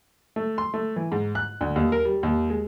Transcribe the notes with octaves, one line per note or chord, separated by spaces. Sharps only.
A3
C6
A3
E3
G#2
F#6
D2
D#2
A#4
G3
D#2
G#3